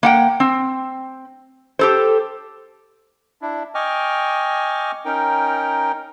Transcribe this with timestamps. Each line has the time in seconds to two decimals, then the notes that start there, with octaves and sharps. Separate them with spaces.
0.03 A#3 F#5 G5
0.40 C4
1.79 G4 A4 C5
3.42 D4 E4
3.75 D#5 G5 G#5 C#6 D6 F6
5.05 C#4 D#4 A#4 G5